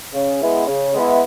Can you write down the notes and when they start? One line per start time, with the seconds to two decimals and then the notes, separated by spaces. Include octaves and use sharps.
0.14 C#3
0.40 G#3 B3 E4
0.67 C#3
0.94 G#3 B3 E4